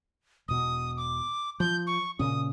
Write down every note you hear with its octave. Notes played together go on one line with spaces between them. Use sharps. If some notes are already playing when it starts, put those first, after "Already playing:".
E1 B2 D#6
D6
F3 G6
C#6
A#2 C#3 C#4 D#6